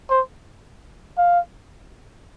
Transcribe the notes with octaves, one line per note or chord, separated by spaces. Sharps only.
C5
F5